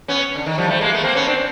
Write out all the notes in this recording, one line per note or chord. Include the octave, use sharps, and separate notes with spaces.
B3 C#4
D3
D#3
F3 G3
G3 A3
G#3 A#3
A3 B3
A#3 C4
B3 C#4
C4 D4